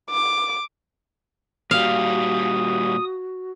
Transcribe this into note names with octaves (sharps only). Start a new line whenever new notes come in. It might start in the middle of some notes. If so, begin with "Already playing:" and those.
D6
A#2 G3 F#4 F5 D#6